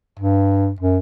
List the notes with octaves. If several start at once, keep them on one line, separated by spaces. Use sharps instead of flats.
G2
F#2